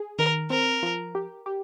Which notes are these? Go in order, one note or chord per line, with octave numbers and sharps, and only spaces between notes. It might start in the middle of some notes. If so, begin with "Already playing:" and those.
Already playing: G#4
D#3 A#4
C4 A#4
F3
G4
G4